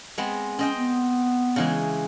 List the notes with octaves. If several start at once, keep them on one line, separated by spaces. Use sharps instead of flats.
G#3 B3 C4
C4 C#4 D#5 G5
B3
C#3 E3 G#3